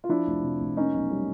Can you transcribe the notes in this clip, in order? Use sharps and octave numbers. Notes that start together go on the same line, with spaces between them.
F4
F3 D4 E4
F1
C3
F1
A#3 C#4 D#4
B1
G3